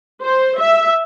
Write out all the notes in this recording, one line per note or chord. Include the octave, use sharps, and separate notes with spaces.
C5
E5